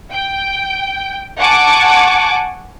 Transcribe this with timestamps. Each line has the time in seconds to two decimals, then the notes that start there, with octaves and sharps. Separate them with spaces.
0.11 G5
1.39 F#5 G#5 A5 C#6 D6